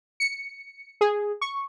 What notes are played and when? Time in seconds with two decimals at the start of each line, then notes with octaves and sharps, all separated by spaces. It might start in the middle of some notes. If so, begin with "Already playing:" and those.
0.20 C#7
1.01 G#4
1.41 C#6